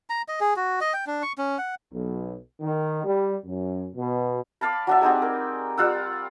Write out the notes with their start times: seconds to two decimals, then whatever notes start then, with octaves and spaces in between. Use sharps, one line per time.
0.10 A#5
0.28 D#5
0.41 G#4
0.56 F#4
0.81 D#5
0.94 G5
1.07 D4
1.23 C#6
1.38 C#4
1.58 F#5
1.93 B1
2.61 D#3
3.03 G3
3.45 F#2
3.96 B2
4.61 D5 F5 A5 B5
4.87 F#3 D4 E5
5.01 G3 C4 D#4 G#4
5.22 A#4
5.77 G3 F4 F#5 E6